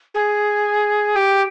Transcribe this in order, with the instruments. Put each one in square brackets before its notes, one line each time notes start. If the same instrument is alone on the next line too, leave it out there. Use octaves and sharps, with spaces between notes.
[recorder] G#4
G4